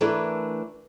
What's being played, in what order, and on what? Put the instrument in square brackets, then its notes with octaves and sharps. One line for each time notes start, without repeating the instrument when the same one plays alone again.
[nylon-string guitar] E3 A3 D4 E4 A#4 B4